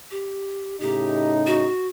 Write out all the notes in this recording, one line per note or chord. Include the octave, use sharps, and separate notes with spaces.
G4
A2 C#3 D#4 G4
F#4